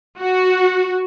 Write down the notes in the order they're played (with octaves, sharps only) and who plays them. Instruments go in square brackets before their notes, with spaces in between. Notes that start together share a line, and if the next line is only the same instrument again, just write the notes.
[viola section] F#4